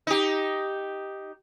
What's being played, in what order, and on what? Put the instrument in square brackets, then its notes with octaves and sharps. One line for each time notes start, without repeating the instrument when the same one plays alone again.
[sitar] D#4 G4